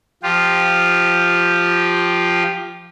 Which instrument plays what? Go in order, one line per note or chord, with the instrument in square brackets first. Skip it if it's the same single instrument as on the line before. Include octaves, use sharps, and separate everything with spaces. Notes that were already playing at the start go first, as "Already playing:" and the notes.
[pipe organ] F3 F4 G4